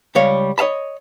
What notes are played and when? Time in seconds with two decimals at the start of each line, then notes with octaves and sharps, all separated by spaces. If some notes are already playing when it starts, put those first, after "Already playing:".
0.15 C#2 G3 C#5 F5
0.58 C#5 D#5 F5 A5 B5